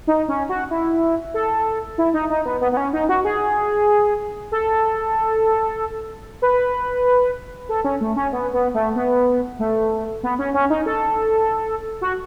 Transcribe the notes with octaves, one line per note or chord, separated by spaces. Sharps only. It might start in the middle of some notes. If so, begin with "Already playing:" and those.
D#4
C#4
F#4
E4
A4
E4
D#4
D#4
B3
B3
B3
C#4
D#4
F#4
G#4
A4
B4
A4
C#4
A3
C#4
B3
B3
A3
B3
A3
B3
C#4
C#4
D#4
A4
F#4